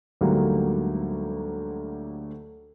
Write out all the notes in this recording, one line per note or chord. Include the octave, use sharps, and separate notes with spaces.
D2 G#2 D3 F#3 G3 A#3